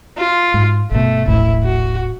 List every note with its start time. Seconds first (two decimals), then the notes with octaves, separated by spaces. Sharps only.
0.18 F4
0.54 G#2
0.91 G1 B2 A3
1.28 D#1 A#1 A2 E4
1.64 F#4